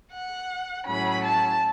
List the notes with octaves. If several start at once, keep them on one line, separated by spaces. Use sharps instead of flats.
F#5
A2 F#3 C#4 B5
A5